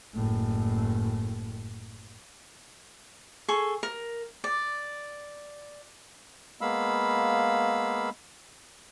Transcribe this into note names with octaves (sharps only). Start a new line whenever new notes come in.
F#1 A2
G#4 A4 C#6
A#4
D5
G#3 A#3 B3 F5 B5 E6